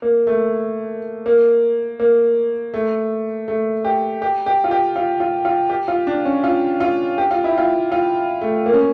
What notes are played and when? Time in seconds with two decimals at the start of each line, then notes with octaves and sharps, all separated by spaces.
0.02 A#3
0.27 A3
1.26 A#3
2.00 A#3
2.74 A3
3.48 A3
3.84 G4
4.22 G4
4.46 G4
4.64 F4
4.71 G4
4.96 F4
5.20 F4
5.45 F4
5.69 G4
5.88 F4
6.07 D4
6.25 C#4
6.44 F4
6.80 F4
7.18 G4
7.31 F4
7.44 E4
7.58 F4
7.92 F4
8.41 A3
8.66 A#3
8.73 C#4